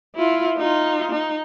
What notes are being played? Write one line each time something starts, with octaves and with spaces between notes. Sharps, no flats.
E4 F4
D#4 F4
D#4